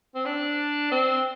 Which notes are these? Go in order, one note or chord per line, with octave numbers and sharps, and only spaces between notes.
C4
D4
C4